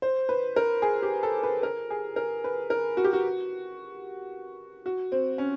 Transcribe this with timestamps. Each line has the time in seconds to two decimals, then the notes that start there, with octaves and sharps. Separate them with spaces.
0.02 C5
0.29 B4
0.56 A#4
0.82 G#4
1.02 G4
1.23 A4
1.43 B4
1.63 A#4
1.90 G#4
2.16 A#4
2.44 B4
2.70 A#4
2.97 F#4
3.04 G4
3.13 F#4
4.86 F#4
5.12 C4
5.38 C#4